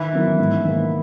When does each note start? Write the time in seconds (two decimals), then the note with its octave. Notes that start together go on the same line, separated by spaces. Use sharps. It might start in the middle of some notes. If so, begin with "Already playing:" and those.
Already playing: D#3 E3
0.13 F#3 B3 E4 A#4
0.39 G#2
0.65 D#3 A#3